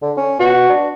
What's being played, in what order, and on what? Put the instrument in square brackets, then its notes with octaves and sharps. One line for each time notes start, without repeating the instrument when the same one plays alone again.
[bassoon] D3
C#4
[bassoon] B2 [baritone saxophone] F#4
[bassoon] D4